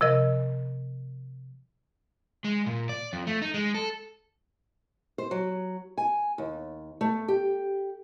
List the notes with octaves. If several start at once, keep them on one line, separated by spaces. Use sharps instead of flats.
C3 F3 A#4 D#5
G#3
A#2
D5
F2
A3
D#4
G#3
A4
C5
F#3
G#5
D#2
A3
G4